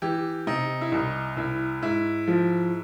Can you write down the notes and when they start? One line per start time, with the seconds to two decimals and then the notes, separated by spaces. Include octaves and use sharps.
0.02 E3 G4
0.47 C3 D#4
0.81 E4
0.92 C2 D#4
1.37 C2 E4
1.82 G#2 E4
2.28 F3